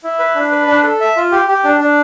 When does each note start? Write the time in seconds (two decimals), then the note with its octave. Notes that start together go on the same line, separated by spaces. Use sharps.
0.04 E4
0.19 B4
0.36 D4
0.51 B4
0.67 D4
0.83 A4
1.00 E5
1.16 F4
1.32 G4
1.48 G4
1.64 D4
1.80 D4